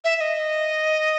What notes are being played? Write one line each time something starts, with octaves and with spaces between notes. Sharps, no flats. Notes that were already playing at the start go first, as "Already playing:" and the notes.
E5
E5
D#5